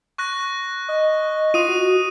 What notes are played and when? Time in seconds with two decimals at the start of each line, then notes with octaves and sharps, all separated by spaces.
0.18 C#6 F#6 A#6
0.88 D#5
1.54 F4 D#6 D#7
1.69 F#4